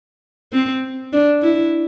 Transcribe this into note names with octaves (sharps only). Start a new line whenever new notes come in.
C4
D4
E4